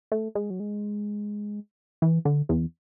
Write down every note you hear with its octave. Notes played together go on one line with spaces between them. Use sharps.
A3
G#3
F#3
G#3
E3
D3
E2